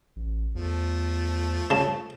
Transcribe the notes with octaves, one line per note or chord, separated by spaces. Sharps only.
A1
E2 F3 A3
C#3 A5